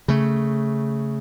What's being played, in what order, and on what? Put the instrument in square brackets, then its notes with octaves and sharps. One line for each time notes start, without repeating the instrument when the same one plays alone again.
[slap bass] C#3 A3